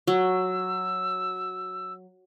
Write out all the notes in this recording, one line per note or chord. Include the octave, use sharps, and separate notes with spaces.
F#3 E6